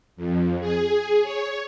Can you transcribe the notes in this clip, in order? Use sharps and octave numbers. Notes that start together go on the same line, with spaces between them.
F2
G#4
C#5